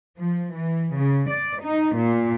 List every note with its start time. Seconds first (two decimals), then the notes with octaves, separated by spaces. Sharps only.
0.17 F3
0.53 E3
0.94 C#3
1.30 D5
1.62 D#4
1.96 A#2